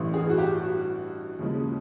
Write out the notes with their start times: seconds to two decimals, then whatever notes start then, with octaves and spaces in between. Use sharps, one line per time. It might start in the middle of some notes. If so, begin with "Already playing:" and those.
Already playing: A1 G2 E3
0.14 G#4
0.30 F#4
0.38 G4
0.63 F#4
1.39 D#2 C#3 F3 G#3